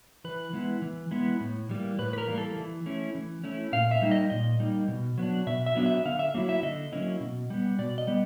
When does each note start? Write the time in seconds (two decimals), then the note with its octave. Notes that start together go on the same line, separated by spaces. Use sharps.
0.24 E3 B4
0.53 G#3 B3 E4
0.82 E3
1.11 G#3 B3 E4
1.40 A2
1.69 E3 G3 A#3
1.99 A2 B4
2.13 B4
2.18 A#4
2.27 E3 G3 A#3
2.38 A4
2.56 E3
2.86 A3 C#4 E4
3.15 E3
3.44 A3 C#4 E4
3.72 A#2 F5
3.91 E5
4.02 G3 A#3 D#4
4.11 D#5
4.30 A#2 D#5
4.60 G3 A#3 D#4
4.88 B2
5.18 F#3 B3 D4
5.47 B2 E5
5.66 E5
5.75 F#3 B3 D4
5.86 E5
6.05 D3 F5
6.19 E5
6.34 F#3 A#3 C#4 E4
6.49 E5
6.62 D3 D#5
6.92 F#3 A#3 C#4 E4
7.20 B2
7.50 G3 B3
7.79 B2 D5
7.98 D#5
8.07 G3 B3